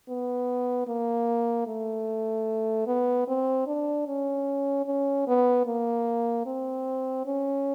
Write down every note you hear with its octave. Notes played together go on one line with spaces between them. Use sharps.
B3
A#3
A3
B3
C4
D4
C#4
C#4
B3
A#3
C4
C#4